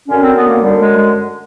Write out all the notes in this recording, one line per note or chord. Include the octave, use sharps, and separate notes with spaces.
F#2 D3 C#4
C4
B3
A#3
F#2 D3 G3
G#3
G#3